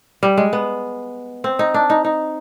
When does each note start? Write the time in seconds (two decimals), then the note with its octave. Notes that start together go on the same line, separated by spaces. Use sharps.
0.23 G3
0.38 G#3
0.53 B3
1.44 C4
1.59 D#4
1.74 D4
1.90 D#4
2.05 D#4